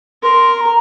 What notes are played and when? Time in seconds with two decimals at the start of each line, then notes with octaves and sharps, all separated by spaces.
0.22 A#4 C6
0.61 A#5